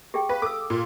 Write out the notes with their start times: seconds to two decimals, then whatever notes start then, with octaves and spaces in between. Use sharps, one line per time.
0.14 G4 G#4 G5
0.29 B4 F5
0.42 A4 D6 E6
0.70 A#2